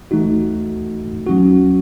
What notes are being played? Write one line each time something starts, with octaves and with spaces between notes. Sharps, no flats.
E3 A3 D#4 F#4
F#3 C#4 F#4